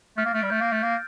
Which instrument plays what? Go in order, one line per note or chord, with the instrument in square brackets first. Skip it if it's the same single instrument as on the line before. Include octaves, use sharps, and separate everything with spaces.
[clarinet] A3 [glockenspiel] F6
[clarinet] A#3
[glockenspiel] A6
[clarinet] A3
[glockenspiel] D7
[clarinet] G3
[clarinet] A3 [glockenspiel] G6
[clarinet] A#3
A3
[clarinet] A#3 [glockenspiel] A6